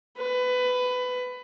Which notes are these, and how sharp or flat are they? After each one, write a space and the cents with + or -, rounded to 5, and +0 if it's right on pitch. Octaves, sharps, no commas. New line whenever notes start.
B4 +20